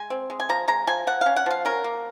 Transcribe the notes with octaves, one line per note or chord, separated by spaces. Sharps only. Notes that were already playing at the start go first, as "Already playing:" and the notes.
Already playing: G#3 G#5
C4
G#3
G#5
F3 A#5
G#3 A#5
F3 G#5
F3 F#5
C#4 F5
F#5
F3 F5
C#4 A#4
A#3